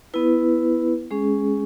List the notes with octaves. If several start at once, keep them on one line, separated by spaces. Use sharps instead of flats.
B3 E4 B4
G#3 C#4 G#4